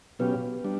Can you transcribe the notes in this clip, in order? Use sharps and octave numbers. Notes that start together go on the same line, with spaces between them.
B2 F#3 B3 C#4 G4 B4
G3 D4